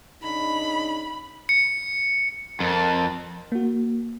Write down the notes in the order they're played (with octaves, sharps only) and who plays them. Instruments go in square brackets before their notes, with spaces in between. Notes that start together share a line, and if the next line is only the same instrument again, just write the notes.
[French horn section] C#3 D4 D#4 [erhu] B5
[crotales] C#7
[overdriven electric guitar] F2 [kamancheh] A#4 A5
[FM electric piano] A#3 F#4